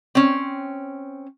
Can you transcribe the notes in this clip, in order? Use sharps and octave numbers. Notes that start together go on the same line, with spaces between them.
C4 C#4